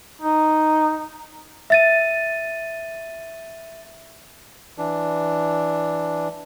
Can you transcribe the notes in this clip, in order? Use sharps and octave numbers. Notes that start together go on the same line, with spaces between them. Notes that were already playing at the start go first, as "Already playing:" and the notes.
D#4
E5 A6 D#7
E3 D4